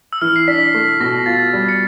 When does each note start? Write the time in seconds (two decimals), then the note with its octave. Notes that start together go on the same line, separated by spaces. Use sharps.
0.13 E6
0.21 E3 F6
0.36 C7
0.48 D4 B6
0.74 A3 B6
1.00 B2 A#6
1.26 F4 A6
1.53 G3
1.69 C#7